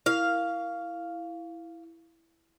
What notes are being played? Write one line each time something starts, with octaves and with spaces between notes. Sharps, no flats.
E4 F5